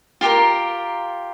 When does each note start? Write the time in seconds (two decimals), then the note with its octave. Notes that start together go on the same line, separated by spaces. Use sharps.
0.21 F4 G4 G#4 A#4